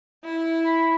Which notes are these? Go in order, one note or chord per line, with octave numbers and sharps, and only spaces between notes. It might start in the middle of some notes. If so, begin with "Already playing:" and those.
E4
B5